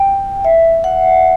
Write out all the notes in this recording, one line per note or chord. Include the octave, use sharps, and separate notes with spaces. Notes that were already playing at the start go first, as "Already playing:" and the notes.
Already playing: G5
E5
F#5